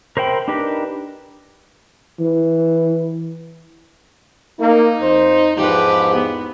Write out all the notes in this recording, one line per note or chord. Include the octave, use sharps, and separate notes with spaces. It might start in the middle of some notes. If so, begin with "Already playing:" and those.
A#4 C5 E5 G5 B5
D4 D#4 G4 A#4 B4
E3
A#3 D#4
F2 C5
E2 G#2 F3 G4 B4
B3